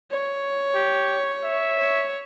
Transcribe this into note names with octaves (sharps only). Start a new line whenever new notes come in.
C#5
G4
E5
C#5